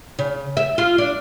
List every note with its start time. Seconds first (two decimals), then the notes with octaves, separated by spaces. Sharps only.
0.19 C#3
0.57 E5
0.78 F4
0.98 D4